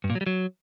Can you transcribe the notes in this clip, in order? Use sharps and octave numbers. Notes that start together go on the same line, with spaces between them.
G2
A#2
F#3
G3
F#3